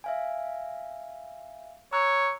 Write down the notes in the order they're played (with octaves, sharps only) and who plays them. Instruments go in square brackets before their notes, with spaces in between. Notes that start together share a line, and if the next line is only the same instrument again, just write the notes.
[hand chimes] E5 F5 G#5
[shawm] C#5 [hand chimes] A#5 E6 F#6